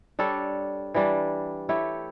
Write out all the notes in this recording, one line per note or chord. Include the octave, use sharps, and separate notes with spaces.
G3 D4 A4 C#5
E3 G3 D4
A3 E4 G4 C#5